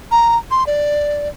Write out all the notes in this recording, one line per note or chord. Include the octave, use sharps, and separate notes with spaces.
A#5
C6
D5